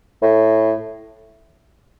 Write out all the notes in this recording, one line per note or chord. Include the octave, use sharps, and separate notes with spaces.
A2